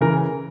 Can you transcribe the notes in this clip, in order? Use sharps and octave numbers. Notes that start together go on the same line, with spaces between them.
C#3 E3 A#4